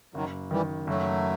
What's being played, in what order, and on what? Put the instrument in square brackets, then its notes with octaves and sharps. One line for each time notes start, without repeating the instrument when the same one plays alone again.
[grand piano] F#1 [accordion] D#3 F#3
[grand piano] D#3 [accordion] E3 G3
[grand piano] F#1 [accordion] F#3 A3